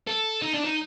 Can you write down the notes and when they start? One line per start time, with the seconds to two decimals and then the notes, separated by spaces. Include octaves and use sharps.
0.07 A4
0.42 D#4
0.54 D4
0.65 D#4